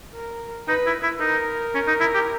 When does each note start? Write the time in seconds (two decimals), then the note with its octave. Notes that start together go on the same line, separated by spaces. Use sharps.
0.15 A#4
0.68 D#4 B4
0.86 E4
1.03 E4
1.21 D#4 A#4
1.75 C#4
1.88 D#4
2.00 E4
2.14 G4